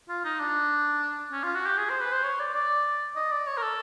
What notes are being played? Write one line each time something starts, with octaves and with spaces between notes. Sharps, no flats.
F4
D#4
D4
C#4
F4
F#4
G4
G#4
C5
B4
C5
C#5
D5
D5
D#5
D5
C#5
A#4
A4